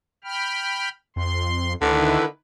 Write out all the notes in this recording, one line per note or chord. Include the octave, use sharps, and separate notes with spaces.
G5 B5 F6
F2 C6
D2 D3 D#3 E4 B4